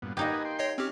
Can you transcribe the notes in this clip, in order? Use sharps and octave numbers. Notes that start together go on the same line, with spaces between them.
G2 A#2 B3
A#3 D#4 G4 B4 D#5 G#5
G5 C6
C#5 D#5 C7
C4 C#4 G4 F6